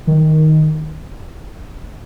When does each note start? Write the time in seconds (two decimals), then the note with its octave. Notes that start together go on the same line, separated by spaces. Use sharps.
0.07 D#3